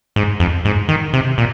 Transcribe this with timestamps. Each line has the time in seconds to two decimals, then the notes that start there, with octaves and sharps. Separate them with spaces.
0.16 G#2
0.40 F2
0.65 G#2
0.89 D#3
1.13 C3
1.38 A#2